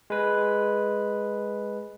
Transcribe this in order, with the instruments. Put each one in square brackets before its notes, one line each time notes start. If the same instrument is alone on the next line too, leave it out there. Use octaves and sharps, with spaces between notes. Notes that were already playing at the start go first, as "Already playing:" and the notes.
[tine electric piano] G#3 B4